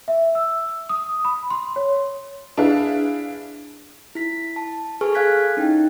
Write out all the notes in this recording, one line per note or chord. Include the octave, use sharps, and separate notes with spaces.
E5
E6
D#6
B5
C6
C#5
D4 E4 G#4 B4 F5
E4 B6
A5
G#4 A4 B4 G#5 C#6 F6
A4 F5 G#5 F#6 G#6 B6
C#4 D#4 E4 G5